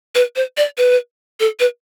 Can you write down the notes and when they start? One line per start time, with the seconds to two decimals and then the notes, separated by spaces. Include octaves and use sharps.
0.15 B4
0.36 C5
0.57 D5
0.78 B4
1.40 A4
1.60 B4